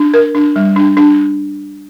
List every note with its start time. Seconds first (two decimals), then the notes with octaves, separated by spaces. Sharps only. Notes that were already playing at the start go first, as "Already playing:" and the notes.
Already playing: D4
0.14 A#4
0.35 D4
0.56 G3
0.76 D4
0.97 D4